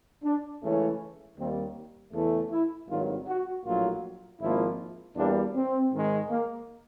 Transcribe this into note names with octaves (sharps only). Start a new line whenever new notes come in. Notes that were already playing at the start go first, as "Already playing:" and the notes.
D4
C#2 C#3 E3 A3 C#4
D#2 D#3 G3 A#3 C4
E2 C#3 E3 A3
E4
G#1 G2 D#3 F#3 F4
F#4
A#1 A2 F#3 A#3 F4
G#1 G#2 F3 A#3 E4
E2 B2 G3 A#3 D4
C4
G#2 D#3 G#3
A#3